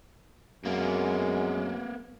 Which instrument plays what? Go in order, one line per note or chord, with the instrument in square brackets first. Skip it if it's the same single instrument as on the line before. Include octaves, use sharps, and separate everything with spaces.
[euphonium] F#2 [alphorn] G#3 [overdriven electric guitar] A#3 B3